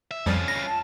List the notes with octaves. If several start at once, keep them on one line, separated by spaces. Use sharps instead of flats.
E5
F2 F3 G3 C#4 F4
A#6
A5